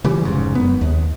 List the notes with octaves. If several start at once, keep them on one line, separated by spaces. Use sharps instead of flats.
C#3 E3 G3
F1 G#2 C#3
F#2 B3
D#2